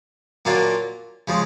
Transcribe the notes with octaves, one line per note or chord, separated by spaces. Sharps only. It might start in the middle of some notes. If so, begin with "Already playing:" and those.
A#2 F#3 A#3 D4 F4
C#3 F3 G#3